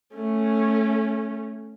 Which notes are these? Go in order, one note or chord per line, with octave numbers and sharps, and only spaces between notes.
A3 C#4